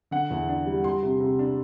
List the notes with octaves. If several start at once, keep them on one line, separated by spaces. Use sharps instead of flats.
D3 F#5
E2
D4
G3
G3 C6
C3
C3
D4